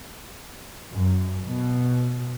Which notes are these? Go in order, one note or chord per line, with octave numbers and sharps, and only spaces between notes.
F#2
B2